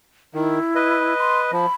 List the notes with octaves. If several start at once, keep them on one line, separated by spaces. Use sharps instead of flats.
D#3 E4
B4 D#5
C6
F3 B5